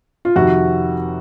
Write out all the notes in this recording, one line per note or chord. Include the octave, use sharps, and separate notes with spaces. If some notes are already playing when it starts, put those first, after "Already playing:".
F4
F2 C3 D#3 F#4